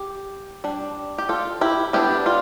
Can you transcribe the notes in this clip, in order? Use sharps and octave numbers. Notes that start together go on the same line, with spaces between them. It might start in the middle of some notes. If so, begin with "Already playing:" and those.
Already playing: G4
G3 D4
G4
F4 A4
E4 G4
G3 B3 D4 E4 G4
F4